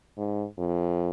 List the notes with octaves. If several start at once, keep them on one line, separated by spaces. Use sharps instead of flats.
G#2
F2